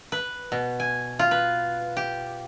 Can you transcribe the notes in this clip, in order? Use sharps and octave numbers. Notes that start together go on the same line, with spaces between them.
B4
B2
G#5
F4
B4
G4